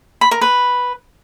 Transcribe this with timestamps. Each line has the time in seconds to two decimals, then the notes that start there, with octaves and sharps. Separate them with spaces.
0.21 B5
0.31 A#4
0.41 B4